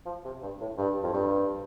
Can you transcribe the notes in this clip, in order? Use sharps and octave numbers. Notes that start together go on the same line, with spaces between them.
F3
C3
G2
A2
G2
F2
G2